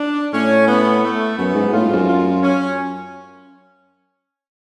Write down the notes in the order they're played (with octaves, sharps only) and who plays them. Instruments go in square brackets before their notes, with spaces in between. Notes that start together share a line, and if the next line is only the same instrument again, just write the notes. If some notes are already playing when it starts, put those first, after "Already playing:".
Already playing: [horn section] D4
[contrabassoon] A2 [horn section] C#4
[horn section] B3
A3
[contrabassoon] F#2 [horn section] B3
[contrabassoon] G#2
[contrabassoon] A2 [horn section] F4
[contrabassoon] G#2
F2
F#2
[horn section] F4
C#4